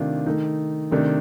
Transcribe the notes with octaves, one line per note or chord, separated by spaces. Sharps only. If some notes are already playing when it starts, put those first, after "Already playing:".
Already playing: C3 D#3 A3 D4 F4
D#3 A3 D#4
C3 D#3 A3 D4